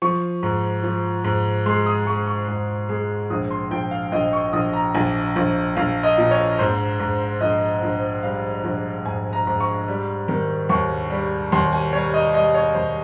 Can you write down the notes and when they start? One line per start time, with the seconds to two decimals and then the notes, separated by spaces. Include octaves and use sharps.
0.02 F3 C#6
0.43 G#2
0.83 F3
1.24 G#2
1.66 G#3 C6
1.86 D#6
2.06 G#3 C#6
2.27 C#6
2.48 G#2
2.89 G#3
3.30 A#1 D#6
3.51 C6
3.71 A#1 G5
3.91 F5
4.12 A#1 D#5
4.33 C#6
4.53 A#1 D#6
4.73 A#5
4.94 A#1 G#5
5.36 A#1
5.76 A#1 F5
6.03 D#5
6.18 A#2
6.31 C#5
6.58 G#2 C5
7.00 G#2
7.41 A#1 D#5
7.82 A#1
8.23 G3 F5
8.64 A#1
9.05 G#2 G#5
9.33 A#5
9.47 G#2
9.60 C#6
9.88 G3
10.28 D#3
10.69 D#2 C#6
11.10 G3
11.52 D#2 C6
11.73 G#5
11.93 G3 C#5
12.14 D#5
12.34 G3 D#5
12.54 C#5
12.75 D#2 C5